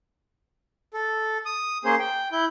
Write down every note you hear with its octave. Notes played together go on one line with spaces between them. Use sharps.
A4
D#6
A#3 C#4 G#4 C5
G5
E4 G6